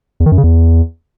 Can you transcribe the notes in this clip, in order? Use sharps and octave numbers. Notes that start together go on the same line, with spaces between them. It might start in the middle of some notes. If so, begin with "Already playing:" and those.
E2
D#3
F#2
C#3
E2